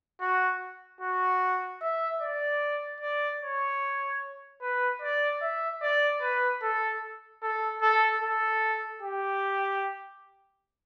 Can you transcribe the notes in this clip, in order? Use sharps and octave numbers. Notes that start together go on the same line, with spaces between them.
F#4
F#4
E5
D5
D5
C#5
B4
D5
E5
D5
B4
A4
A4
A4
A4
G4